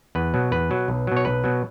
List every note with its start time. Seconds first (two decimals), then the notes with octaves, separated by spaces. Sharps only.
0.15 E2 B4
0.34 B2 F#3
0.51 E2 B4
0.70 B2 F#3
0.88 B1
1.07 B2 F#3
1.17 C#5
1.25 B1 B4
1.44 B2 F#3